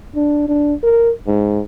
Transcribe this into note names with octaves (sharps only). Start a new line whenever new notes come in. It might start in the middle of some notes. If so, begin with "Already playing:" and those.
D4
D4
A#4
G#2